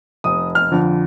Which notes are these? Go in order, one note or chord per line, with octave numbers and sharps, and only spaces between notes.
F1 D#6
F6
F2 D3 F3